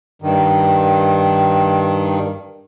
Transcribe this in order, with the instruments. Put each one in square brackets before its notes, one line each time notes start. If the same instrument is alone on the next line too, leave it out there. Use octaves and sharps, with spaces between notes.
[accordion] G2 D#3